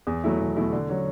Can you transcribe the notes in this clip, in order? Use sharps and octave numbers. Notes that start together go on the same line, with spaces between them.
E2
B2 F#3 A3 E4
E2
B2 F#3 A3 E4
D3
F#3 C#4